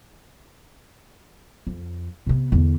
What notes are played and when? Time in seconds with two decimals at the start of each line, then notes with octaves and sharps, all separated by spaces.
1.67 F2
2.27 C3 B3
2.52 E2 D3